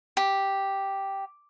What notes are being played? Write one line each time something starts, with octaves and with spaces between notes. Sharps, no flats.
G4